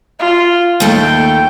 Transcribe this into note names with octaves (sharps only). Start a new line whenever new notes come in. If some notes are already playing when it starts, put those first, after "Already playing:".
F4
D#2 A3 G5